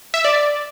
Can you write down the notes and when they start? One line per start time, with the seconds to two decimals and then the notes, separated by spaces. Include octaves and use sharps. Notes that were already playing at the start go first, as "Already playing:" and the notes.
0.14 E5
0.25 D5